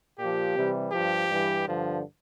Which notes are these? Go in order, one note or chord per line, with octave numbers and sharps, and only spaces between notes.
A#2 F3 G4
C3 E3 G3
G2 F3 G4
G2 E3 G3
G2 D3 F3